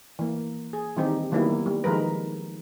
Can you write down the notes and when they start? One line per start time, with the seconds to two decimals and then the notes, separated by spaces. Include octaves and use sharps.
0.19 E3 A#3
0.73 G#4
0.96 D#3 E3 G3 C4 D#4 G4
1.32 D#3 F#3 G3 A#3 B3 E4
1.66 G3
1.84 D#3 F3 G#3 A#4 B4